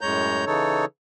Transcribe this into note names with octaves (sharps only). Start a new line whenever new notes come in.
F#2 A2 G#3 C#5 A#5 G6
C#3 E3 D#4 A4 C#5